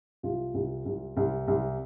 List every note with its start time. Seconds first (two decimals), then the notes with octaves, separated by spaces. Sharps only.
0.23 C2 F4
0.54 C2
0.85 C2
1.17 C2
1.48 C2